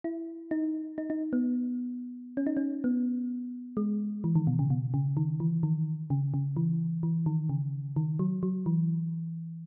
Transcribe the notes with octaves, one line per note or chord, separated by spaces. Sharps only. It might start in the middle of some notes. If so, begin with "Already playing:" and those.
E4
D#4
D#4
D#4
B3
C#4
D#4
C#4
B3
G#3
E3
D#3
B2
C#3
B2
C#3
D#3
E3
D#3
C#3
C#3
E3
E3
D#3
C#3
D#3
F#3
F#3
E3